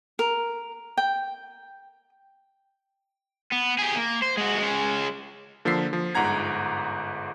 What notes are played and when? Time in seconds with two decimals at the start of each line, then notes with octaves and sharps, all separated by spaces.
0.19 A#4
0.97 G5
3.52 B3
3.79 G4 G#4
3.95 A#3
4.22 C5
4.37 G#3 F#4
4.58 G#3 C#4
5.65 D3 F3 A#3 A4 B6 C7
5.93 F3
6.15 G1 G#2 F#5 A#5 G#6